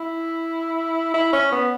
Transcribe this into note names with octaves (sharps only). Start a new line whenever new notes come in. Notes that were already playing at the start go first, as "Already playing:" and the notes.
Already playing: E4
E4
C#4
B3